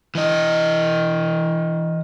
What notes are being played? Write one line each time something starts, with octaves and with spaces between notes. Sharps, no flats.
E3 D#5